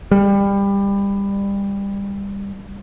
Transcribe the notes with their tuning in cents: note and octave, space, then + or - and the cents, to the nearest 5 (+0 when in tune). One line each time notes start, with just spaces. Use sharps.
G3 +25